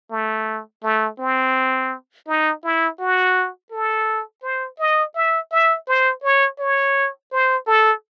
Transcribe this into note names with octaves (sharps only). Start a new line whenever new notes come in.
A3
A3
C4
D#4
E4
F#4
A4
C5
D#5
E5
E5
C5
C#5
C#5
C5
A4